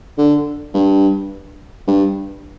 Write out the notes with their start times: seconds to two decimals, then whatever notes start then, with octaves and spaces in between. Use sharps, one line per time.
0.18 D3
0.74 G2
1.87 G2